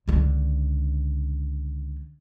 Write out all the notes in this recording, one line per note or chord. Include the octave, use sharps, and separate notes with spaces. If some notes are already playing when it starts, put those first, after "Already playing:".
C#2 D3